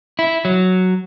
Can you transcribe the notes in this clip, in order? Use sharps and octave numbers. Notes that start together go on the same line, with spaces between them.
E4
F#3